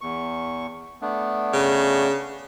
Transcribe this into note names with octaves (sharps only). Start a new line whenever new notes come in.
E2 C#6
A3 B3 D4
C#3